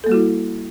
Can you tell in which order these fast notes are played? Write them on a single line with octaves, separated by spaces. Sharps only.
A4 A#3 G3 F#4 E4